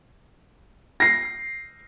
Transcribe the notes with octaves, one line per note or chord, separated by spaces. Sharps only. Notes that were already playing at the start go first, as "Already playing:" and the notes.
A#6 C7